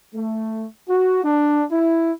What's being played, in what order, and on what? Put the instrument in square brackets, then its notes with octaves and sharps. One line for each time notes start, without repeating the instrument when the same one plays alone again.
[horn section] A3
F#4
D4
E4